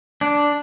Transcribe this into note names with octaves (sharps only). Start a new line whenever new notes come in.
D4